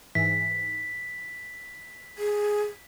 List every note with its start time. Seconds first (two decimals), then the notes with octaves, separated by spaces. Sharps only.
0.15 G#2 E3 B6
2.18 G#4